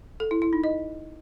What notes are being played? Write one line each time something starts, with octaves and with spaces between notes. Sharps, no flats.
A4
E4
E4
D#4
D#5